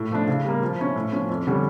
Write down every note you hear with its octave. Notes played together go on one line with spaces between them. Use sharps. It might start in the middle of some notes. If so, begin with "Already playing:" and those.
Already playing: A2
F3 A3 D4
C#3
G3 A#3
F3
C#4 E4
A2
F3 C#4
F2
D3 G3 C#4